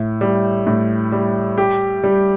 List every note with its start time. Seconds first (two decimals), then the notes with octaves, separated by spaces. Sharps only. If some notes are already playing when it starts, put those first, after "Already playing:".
Already playing: A2
0.21 G3
0.67 A2
1.12 G3
1.58 G4
2.04 G3